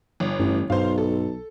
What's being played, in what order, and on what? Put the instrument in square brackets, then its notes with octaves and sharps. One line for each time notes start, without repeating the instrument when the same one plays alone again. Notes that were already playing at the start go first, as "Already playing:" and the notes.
[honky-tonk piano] G1
[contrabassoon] A1 [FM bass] G2
[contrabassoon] B1 [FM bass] G2 [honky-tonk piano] C5 F5
[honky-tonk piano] A4